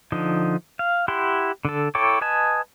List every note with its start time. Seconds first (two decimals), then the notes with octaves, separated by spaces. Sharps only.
0.12 D3 F3 D#4
0.79 F5
1.08 E4 G4 F#5 C6
1.65 D3 A4
1.95 E4 A4 C#5 G5 D6
2.21 B4 D#5 G#5 A5